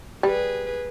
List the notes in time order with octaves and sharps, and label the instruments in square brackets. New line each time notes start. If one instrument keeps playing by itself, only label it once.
[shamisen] G3 [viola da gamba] G#4 B4